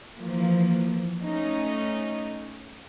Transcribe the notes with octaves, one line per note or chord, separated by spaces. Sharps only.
E3 F3 A#3
A3 C#4 D#4 D#5